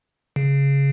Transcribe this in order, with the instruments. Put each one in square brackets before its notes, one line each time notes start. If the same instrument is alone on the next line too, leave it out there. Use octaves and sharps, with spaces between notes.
[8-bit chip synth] C#3